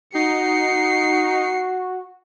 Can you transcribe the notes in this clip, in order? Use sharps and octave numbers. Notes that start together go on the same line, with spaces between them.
D#4 F#4 C7 C#7